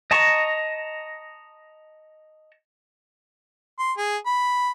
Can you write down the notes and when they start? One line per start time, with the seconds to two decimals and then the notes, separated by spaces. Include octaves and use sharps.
0.11 D#5 A5 A#5 C#6
3.79 C6
3.97 G#4
4.26 B5